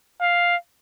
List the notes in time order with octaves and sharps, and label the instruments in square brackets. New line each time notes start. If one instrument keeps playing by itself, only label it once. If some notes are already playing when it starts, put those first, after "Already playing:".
[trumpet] F5